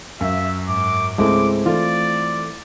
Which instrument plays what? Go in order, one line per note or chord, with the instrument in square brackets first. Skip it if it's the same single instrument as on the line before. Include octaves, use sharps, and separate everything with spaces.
[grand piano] F#2 [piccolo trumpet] E5 [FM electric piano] F5
[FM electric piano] G#2 [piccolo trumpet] D6
[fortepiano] C#2 G#3 A3 [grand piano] C4 E4 [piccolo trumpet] D6
[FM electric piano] E3 A3 A4 [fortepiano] F4 [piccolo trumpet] D5